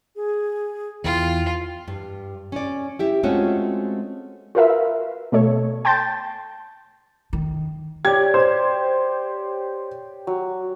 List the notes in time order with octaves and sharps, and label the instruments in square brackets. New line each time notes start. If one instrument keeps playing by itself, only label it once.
[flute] G#4
[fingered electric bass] E2 [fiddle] F4 [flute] G5
[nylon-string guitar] G2
C#4 D5
E4 G4 E5
G#3 A3 C4 C#4 F4 F#4
[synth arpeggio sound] F4 F#4 A#4 B4 E5 F5
B2 A3 A4 C#5
G5 A5 C6 G6 A6
[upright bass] D#3
[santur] G4 C#5 D5 [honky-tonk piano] G#6
[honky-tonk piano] C5
[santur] F#3